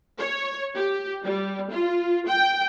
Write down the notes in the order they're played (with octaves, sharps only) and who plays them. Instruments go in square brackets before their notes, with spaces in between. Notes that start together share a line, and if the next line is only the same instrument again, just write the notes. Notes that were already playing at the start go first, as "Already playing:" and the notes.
[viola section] C#5
G4
G3
F4
G5